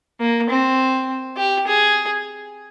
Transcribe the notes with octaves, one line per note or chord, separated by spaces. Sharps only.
A#3
C4
G4
G#4